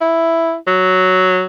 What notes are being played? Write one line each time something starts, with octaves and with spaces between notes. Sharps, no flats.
E4
F#3